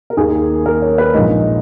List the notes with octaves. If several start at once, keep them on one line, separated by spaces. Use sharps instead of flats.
A#4
D#2 D#3 A#3 G#4
A#4
C#5
B4
A#1 A#2 G#3 D#4